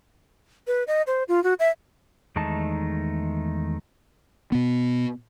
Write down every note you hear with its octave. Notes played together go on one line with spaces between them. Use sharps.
B4
D#5
C5
F4
F#4
E5
E2 D#3 G#3 A3 D#4 A5
B2 B3